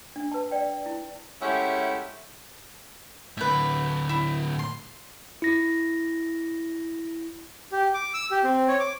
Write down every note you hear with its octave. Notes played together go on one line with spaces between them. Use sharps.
D4
B4 A5
D5 G5
E4
G#3 A3 C#4 E4 G4 F#5
A2 D3 B4 E5
E4
C6
E4 A#6
G4
D6
E6
G4
C4
C#5
D6